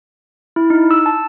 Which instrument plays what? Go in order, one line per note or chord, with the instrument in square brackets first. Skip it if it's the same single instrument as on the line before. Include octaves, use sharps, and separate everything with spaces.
[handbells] E4
D#4
E6
A5